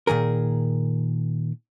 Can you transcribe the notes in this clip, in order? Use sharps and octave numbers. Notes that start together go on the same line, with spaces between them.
A#2 D#3 G#4 A#4